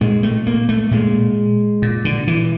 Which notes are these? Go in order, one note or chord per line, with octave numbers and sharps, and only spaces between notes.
A#2 G#3
A3
A#3
A3
A#2 G#3
A#2
D3
E3